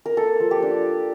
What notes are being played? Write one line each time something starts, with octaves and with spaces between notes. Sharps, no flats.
A#4
A#3 A4
F3
G4
D4